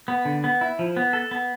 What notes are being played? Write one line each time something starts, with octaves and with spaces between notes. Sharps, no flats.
B3
D3
B3
E4
F3
B3
A4
B3